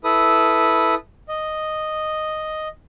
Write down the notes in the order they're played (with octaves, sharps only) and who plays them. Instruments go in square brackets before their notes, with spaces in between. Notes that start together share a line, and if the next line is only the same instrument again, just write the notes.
[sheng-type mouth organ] E4 A4 B4 D#6
D#5